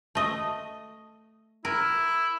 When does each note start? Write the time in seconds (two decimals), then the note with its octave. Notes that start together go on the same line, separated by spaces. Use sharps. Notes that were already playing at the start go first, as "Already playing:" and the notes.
0.15 A3 D#5
1.65 E4 A#4